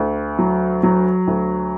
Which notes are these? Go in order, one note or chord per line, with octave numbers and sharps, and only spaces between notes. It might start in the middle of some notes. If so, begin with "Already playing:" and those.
Already playing: D2
F#3
F#3
D2